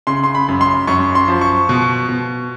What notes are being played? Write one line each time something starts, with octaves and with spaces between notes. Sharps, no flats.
C#3 C6
C6
B5
F#2
C6
F#2 C#6
C6
F3
C#6
B2
B2